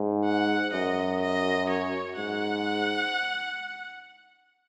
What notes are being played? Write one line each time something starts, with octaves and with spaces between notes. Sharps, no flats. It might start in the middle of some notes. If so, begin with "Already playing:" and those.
Already playing: G#2
F#5
F#2 D#5
D#5
C#5
G#2 F#5